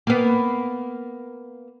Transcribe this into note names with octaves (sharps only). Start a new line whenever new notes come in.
A#3 B3